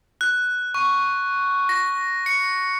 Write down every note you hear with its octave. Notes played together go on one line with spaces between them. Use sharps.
F#6
C#6
A#6
C#7